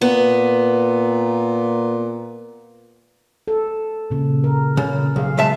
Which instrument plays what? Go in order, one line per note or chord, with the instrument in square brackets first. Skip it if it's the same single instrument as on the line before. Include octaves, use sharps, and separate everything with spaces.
[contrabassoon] A#2 [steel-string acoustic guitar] B3
[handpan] A4
A#2 C#3
A#4
[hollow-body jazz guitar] C#3
[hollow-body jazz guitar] B1 [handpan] F#3 G#4 F5
[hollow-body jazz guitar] G#3 E5 A5